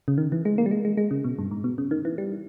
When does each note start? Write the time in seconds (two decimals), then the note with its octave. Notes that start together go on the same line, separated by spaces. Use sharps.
0.08 C#3
0.18 D#3
0.32 E3
0.45 G#3
0.58 A#3
0.66 G3
0.71 G#3
0.85 G#3
0.97 G#3
1.11 C#3
1.24 B2
1.39 G2
1.51 G#2
1.64 B2
1.78 C#3
1.91 D#3
2.05 E3
2.18 G3